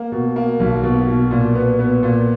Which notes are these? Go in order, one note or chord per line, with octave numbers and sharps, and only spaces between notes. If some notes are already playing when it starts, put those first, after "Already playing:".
Already playing: A#3
B2
A#3
B1
B2
B2
A#2
B3
B3
A#2